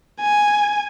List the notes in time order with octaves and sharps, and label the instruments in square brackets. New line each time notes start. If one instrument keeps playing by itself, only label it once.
[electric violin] G#5